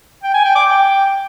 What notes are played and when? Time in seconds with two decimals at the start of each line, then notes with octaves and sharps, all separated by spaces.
0.23 G5
0.34 G#5
0.45 G5
0.55 D6
0.66 G5